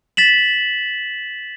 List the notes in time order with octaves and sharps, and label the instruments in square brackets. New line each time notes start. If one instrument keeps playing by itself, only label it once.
[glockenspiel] A6 B6 E7 F#7